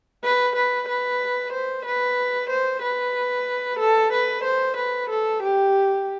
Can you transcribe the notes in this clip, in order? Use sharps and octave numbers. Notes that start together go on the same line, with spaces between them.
B4
B4
B4
C5
B4
C5
B4
A4
B4
C5
B4
A4
G4